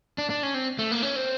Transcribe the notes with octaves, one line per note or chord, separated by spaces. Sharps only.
D4
D4
C#4
C4
A3
A#3
C#4
C4